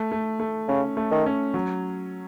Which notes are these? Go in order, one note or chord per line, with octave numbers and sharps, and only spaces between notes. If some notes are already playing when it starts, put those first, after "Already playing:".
Already playing: A3
A3
A3
C#3 C#4
A3
D#3
C#4
F#3